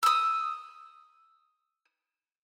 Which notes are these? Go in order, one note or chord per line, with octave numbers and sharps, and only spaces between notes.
D#6 E6